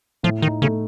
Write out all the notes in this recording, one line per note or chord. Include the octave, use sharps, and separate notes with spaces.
A2 F3
D#3 D#4
C#3 A3